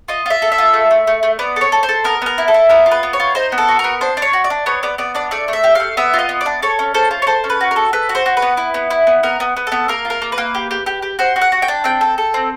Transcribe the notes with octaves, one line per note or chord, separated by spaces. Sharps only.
F4 D#5
F4 E5
A4
E5
F4
A3
A3
A3
A3
B3 D5
A4 C#5
A4
C5
A4
B3 A#4
B3 A#4
E4
A4
E4
B3 A#4
F4
B4
B3
C#5
F4
D#4 C5
B3
A4
F#4
A#4
B3
D4 C5
D4
C#5
F#4
D5
D4
B3 C#5
B3 D5
B3 D5
D4 D5
A3 D5
A3
E5
G4
A3 F5
B3 E5
F4 D#5
B3
D5
D4
A4 C#5
C#4
A4 C5
F4
C#5
A4 C5
C#4
B4
F#4
A#4
A4
A4 B4
F#4
C5
F#4
B4
B3
E4
B3
E4
B3
B3 A#4
B3
B3
B3 A4
A#3 A#4
F4
A#4
A#3
B4
A#3
G4
G4
G4
G4
F#4 C5
F#4
F#5
F#4
G5
D4
C4 G5
A4
A4
C4